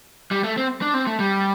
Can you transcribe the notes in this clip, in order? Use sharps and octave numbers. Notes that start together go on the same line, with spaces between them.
G3
A3
C4
D4
C4
A3
G3